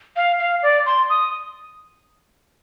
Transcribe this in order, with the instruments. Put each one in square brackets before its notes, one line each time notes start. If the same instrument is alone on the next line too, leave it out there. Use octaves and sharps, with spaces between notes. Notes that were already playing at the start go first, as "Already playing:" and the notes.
[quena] F5
F5
D5
C6
D#6